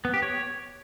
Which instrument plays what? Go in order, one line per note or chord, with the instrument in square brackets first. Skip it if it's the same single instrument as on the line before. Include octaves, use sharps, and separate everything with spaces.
[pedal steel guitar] B3
G4
C#5